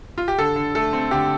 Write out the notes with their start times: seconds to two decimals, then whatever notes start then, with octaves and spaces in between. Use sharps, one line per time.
0.18 F4
0.28 G4
0.38 D3 A4
0.56 D3
0.75 A3 A4
0.93 C4
1.11 D3 G4